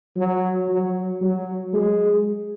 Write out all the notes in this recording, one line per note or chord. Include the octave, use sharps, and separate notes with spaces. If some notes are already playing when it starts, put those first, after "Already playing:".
F#3
F#3
F#3
G#3